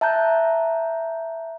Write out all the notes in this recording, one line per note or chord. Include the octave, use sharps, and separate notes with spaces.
E5 A5 A#5 F#6 G6